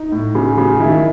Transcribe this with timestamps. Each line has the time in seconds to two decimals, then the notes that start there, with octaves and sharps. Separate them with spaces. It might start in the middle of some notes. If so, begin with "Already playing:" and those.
Already playing: D#4
0.12 A2
0.35 C#3
0.58 C#3
0.80 D#3 E4